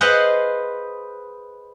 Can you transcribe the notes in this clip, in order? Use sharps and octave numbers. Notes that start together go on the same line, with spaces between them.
G#4 B4 C5 D#5 F5 F#5